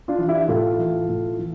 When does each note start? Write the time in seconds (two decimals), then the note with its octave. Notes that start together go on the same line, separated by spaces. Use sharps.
0.08 D4 F4
0.18 E3
0.28 E4 G4
0.48 A2 F4 A4
0.79 E3
1.09 A2
1.39 E3